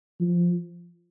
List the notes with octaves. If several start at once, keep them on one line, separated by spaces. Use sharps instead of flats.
F3